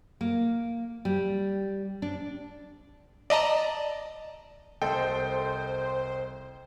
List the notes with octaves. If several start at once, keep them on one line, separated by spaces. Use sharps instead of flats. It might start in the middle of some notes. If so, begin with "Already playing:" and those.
A#3
G3
D4
D5 D#5 A5 A#5
C2 A4 C5 D#5 G5